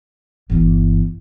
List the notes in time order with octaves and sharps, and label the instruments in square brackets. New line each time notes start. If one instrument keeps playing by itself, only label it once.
[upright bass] G1 E3